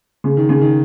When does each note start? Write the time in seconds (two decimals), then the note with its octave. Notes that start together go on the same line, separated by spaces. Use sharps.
0.24 C#3
0.37 D#3
0.49 C#3
0.61 D#3